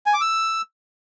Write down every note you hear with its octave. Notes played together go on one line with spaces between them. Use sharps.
G#5
D6
E6